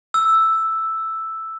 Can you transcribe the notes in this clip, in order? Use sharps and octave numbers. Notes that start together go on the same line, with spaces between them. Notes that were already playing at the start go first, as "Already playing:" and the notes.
E6